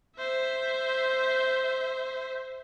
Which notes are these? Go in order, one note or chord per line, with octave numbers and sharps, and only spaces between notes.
C5 E5